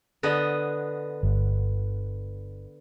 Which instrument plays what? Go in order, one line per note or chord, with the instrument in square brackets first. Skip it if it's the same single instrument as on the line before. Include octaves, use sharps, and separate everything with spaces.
[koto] D3 B3 D#5
[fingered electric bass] G1